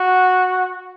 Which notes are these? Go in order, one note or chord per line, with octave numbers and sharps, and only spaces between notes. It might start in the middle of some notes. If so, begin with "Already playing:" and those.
Already playing: F#4